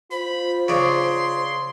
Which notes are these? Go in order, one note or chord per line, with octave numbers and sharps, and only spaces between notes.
F4 C5 B5
C#3 D4 C6